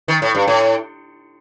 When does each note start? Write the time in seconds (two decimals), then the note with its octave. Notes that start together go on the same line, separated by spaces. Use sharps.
0.08 D#3
0.22 A2
0.35 G2
0.47 A2